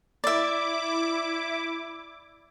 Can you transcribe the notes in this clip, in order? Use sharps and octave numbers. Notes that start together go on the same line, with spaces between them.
E4 D5 E5 D6